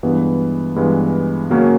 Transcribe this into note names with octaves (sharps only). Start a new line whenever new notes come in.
G2 E3 G#3 B3
G2 E3 G#3 B3
C#3 F#3 A#3 C#4